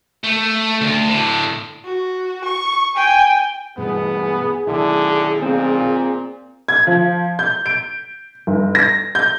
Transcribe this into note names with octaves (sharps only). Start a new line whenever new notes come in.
A3
D2
A2 D3
F#4
C#6
G5 G#5
G2 B2 E3 B3 G#4
B1 D3 D#3 E4
A#2 C4 F4
G#6
F3
G6
D7
G1
A#6
G6